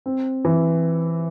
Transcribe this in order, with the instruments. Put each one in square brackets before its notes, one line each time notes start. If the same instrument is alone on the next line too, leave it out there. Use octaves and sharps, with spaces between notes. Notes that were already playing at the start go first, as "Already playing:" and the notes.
[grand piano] C4
E3